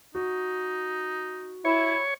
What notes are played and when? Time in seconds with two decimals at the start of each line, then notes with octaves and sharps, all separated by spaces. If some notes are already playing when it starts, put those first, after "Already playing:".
0.15 D#4 F#4
1.65 E4 C#5